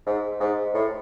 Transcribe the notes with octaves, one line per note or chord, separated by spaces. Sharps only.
G#2
G#2
A2